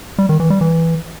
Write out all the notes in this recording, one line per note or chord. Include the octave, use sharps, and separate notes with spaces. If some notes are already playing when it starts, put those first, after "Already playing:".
G3
D#3
E3
G3
E3